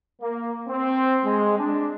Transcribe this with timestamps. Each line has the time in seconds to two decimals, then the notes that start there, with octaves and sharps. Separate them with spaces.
0.22 A#3
0.68 C4
1.25 G#3
1.59 D4